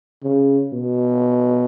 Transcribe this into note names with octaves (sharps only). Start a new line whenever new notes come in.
C#3
B2